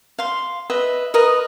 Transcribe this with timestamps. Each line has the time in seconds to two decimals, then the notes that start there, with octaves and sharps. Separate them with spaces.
0.19 F5 C6
0.70 B4 D#5 E5
1.14 A#4 B4 D#5 D#6